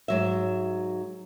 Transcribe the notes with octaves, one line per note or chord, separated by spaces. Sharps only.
G#2 F#3 E5